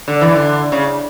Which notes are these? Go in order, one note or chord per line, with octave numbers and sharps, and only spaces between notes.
D3
E3
D3
C#3